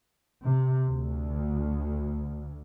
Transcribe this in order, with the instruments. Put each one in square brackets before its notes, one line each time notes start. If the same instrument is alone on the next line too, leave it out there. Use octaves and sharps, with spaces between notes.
[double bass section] C3
D2